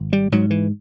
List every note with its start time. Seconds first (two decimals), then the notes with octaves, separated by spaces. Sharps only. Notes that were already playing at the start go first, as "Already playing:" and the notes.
Already playing: G#1
0.13 G3
0.32 G#2 F#3
0.50 E3